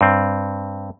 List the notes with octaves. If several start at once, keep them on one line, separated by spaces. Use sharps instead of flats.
G2 C4